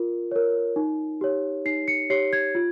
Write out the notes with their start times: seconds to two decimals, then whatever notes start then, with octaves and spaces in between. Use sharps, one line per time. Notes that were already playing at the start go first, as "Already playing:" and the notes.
Already playing: F4 A#4
0.31 A#4 C#5
0.76 D#4
1.21 G4 C#5
1.65 D#4 C7
1.88 C#7
2.10 G4 C#5 C7
2.33 G#6
2.55 F4